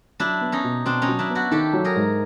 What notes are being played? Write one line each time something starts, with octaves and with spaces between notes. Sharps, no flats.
F#3 D4 E4
B3
C#4 D#4
B2
B2 C4 D4
C#4 D#4
F#3
D4 E4
B3
E4 F#4
D#3 G4 A4
F#3
G#4 A#4
G#2